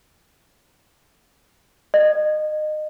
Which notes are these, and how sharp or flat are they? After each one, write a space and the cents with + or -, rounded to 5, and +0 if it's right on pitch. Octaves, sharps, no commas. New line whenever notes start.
D#5 -25